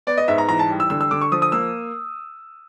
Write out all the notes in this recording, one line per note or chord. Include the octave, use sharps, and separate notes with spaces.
B3 D5
D#5
G#2 E5
A#5
E3 A#5
A5
G3
E6
D3 E6
E6
D3 D6
C#6
F3 D#6
D#6
A#3 E6